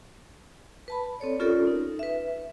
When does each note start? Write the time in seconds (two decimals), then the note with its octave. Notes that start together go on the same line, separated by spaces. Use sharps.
0.88 B4 A5 B5
1.20 C4 A4 C#5 D5
1.39 C#4 F4 G4 A4 A#4 D5
1.67 D#4
1.99 B4 E5